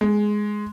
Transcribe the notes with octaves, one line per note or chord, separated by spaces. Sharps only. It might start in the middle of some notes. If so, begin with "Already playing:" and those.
G#3